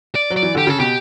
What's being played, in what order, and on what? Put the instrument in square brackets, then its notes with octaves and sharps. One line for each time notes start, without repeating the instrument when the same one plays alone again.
[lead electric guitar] D5
[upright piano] F#3
[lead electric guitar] D5
[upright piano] E3
[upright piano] D3 [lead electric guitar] G4
[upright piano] C#3 [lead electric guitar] A4
[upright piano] B2 [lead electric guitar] G4